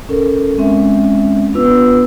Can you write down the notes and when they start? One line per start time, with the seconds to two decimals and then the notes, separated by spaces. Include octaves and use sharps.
0.09 C#4 A4 A#4
0.57 G#3 C4 C#4 E5
1.53 B3 D4 F4 B4 E6